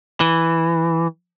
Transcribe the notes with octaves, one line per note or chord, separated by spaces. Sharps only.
E3